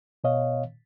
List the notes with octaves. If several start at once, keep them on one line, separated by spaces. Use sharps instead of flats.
B2 B3 C#5 D#5 F5